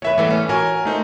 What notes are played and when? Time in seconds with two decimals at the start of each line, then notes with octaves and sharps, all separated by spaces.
0.02 E2 F#4 B4 C#5 E5
0.18 E3 G3 A3 B3
0.30 C#4
0.49 F4 F#4 A#4 C#5 G#5
0.85 A3 D#4 C5